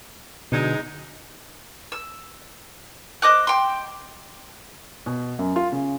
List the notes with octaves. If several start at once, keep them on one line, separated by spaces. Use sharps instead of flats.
B2 D3 F#3 G#3 D#4
E6
C5 D#5 D6 F#6
G5 C6
B2
F#2
F4
C#3